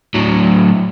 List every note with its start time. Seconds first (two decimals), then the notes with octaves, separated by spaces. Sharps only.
0.14 A2 F#3